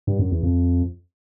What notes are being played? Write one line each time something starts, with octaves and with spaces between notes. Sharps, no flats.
G2
F#2
E2
F2